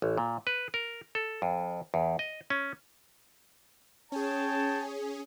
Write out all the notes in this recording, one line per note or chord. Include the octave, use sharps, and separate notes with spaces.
A1
A#2
B4
A#4
A4
F2
E2
D#5
C#4
C#4 G#4 C#5 G5 A5